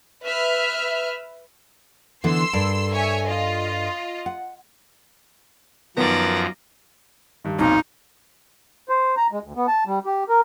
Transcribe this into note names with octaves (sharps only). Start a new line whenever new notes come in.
B4 E5 F6
D3 E3 B3 C6 E6
G2 A4 A#4
C#5 E5 G#5
F4 D#5
F#5
F#2 D#3 F3 B3 D5 A#5
G2 D#3
B1 F2 A#2 D#4
C5
A#5
G#3
D2
B3
A5
G3
G4
A#4